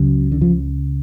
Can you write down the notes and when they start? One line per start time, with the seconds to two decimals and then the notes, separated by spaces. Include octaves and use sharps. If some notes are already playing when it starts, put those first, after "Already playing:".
Already playing: C#2 C#3 F#3
0.32 D3
0.41 F3